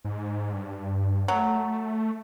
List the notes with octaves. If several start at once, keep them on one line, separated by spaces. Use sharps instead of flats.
G#2
G2
F#3 A3